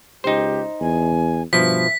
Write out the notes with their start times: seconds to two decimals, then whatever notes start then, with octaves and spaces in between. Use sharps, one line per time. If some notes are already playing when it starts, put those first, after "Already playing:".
0.24 C#2 D#4 G4 C5
0.80 E2 G#5
1.53 G2 B2 F3 E5 B6